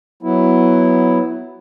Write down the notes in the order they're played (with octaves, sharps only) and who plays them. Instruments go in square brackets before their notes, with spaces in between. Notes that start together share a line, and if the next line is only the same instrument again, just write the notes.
[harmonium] F#3 B3 E4